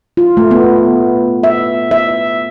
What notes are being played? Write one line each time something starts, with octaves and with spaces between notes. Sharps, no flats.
F4
A3
B3
E5
E5